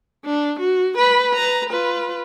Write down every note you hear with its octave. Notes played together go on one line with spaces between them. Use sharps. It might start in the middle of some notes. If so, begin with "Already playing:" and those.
D4
F#4
B4 B5
B4 A#5
F4 B4